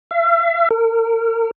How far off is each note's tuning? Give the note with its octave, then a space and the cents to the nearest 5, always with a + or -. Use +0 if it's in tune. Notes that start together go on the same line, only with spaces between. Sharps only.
E5 +45
A#4 -35